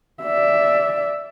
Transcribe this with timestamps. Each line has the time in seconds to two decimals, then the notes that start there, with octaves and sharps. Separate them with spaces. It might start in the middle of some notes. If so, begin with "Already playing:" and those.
0.23 D5 E5